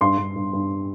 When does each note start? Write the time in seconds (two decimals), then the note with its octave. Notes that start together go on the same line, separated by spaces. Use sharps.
0.01 G2 C6
0.18 G2
0.36 G2
0.53 G2